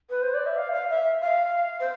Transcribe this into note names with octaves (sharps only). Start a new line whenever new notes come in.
B4
C5
D5
E5
F5
F5
E5
F5
C5